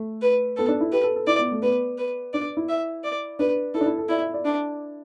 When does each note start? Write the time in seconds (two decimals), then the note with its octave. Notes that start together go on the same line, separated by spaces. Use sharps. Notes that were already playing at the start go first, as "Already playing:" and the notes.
Already playing: A3
0.22 B4
0.57 B3 A4
0.69 D4
0.81 E4
0.92 G4 B4
1.03 A4
1.16 A4
1.27 E4 D5
1.39 B3
1.51 A3
1.62 B3 B4
1.98 B4
2.33 D4 D5
2.57 E4
2.69 E5
3.04 D5
3.39 D4 B4
3.74 E4 A4
3.81 D4
3.86 E4
3.98 A4
4.09 E4 D5
4.22 E5
4.34 D5
4.45 D4